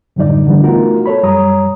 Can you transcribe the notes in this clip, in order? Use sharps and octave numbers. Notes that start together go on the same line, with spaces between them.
F#2 A2 D3 G3 D#4 D5
D3 E3 G3 D4
A3 B3 D#4 F4 F#4 A#4
A4 C#5 B5
F#2 G3 C#5 A#5 D#6